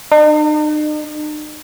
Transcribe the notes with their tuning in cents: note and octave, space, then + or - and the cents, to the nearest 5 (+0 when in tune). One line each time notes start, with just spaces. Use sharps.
D#4 -45